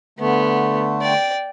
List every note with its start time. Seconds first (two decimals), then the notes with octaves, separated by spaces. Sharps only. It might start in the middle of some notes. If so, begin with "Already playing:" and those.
0.19 D3 A3 B3
1.01 D5 G5